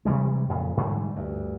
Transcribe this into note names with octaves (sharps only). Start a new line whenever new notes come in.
C3 E3 G3 G#3
F2 A#2 C#3
G#2 D3 E3 G3
D2 G2